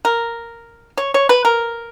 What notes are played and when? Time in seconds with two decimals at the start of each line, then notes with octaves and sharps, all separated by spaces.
0.05 A#4
0.97 C#5
1.14 C#5
1.29 B4
1.45 A#4